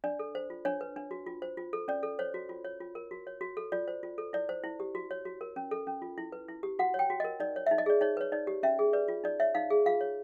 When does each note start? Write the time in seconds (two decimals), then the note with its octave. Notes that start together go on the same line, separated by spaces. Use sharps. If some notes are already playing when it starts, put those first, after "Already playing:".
0.04 D4 D5
0.19 A4
0.35 C5
0.50 F4
0.65 D4 C#5
0.81 B4
0.96 D4
1.11 F#4
1.26 F4
1.42 C5
1.57 F4
1.73 A4
1.88 C#4 D5
2.03 A4
2.19 C5 C#5
2.34 F#4
2.49 F4
2.65 C#5
2.80 F4
2.95 A#4
3.11 F#4
3.27 C#5
3.41 F#4
3.57 A4
3.72 F4 D5
3.88 C5
4.03 F4
4.18 A4
4.33 E4 D5
4.49 C5
4.64 E4
4.80 G4
4.95 F#4
5.11 C#5
5.25 F#4
5.41 A#4
5.56 C#4
5.71 A4
5.87 C#4
6.02 F4
6.18 E4
6.32 B4
6.48 E4
6.63 G4
6.79 F#4 F#5
6.94 C#5
6.99 G5
7.10 F#4
7.20 A#4 D#5
7.40 D#4 D5
7.56 C#5
7.66 D#4 E5
7.78 D#5
7.86 G#4 D5
8.01 D#4 C#5
8.17 B4 C#5
8.32 D#4 D5
8.47 G4
8.63 C#4 E5
8.79 G#4
8.93 B4 D5
9.08 F4
9.24 D#4 D5
9.40 C#5 E5
9.55 D#4 F5
9.70 G#4
9.86 F4 F5
10.01 C#5